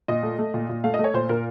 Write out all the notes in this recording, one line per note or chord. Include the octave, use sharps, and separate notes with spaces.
A#2 D#5
A3
A3
A#2
A#2
A3 F5
D#5
A3
C#5
A#2 C5
A#2 A#4